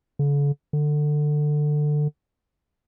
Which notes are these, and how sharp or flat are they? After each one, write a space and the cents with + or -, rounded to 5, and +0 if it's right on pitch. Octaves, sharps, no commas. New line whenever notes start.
D3 -45
D3 +20